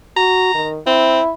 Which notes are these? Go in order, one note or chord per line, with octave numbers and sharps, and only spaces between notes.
F#4 A#5
D#3
C4 E4